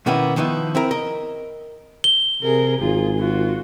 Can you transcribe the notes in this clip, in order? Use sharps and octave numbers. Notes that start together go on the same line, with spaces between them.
B2 D#3 A#3 B3 C#4 E4
D#3 F3 B3 D#4 E4
C4 E4 A#4
A#4 D#5
G7
C3 G#4 A#4
G#1 F4 G#4
F4 F#4